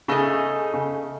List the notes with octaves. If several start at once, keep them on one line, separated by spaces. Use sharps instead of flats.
C#3 A3 D#4 G#4 D#5
C#3